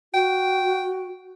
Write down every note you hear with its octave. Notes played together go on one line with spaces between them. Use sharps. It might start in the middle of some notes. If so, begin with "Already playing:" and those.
F#4 G5